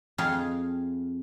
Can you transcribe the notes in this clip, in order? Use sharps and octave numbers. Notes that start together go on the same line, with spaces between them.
F2 G#4 D#5 F5